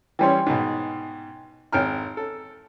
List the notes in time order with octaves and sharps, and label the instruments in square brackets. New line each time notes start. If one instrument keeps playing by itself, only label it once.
[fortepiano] E3 G3 C#4 [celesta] G5 G#5 C6
[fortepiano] G#2 B2
[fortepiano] G#1 G5 F6 [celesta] A#5 D7
[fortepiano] A4